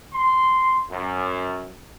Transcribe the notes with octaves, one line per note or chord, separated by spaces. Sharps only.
C6
F#2